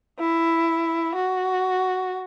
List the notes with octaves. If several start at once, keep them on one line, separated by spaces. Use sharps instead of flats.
E4
F#4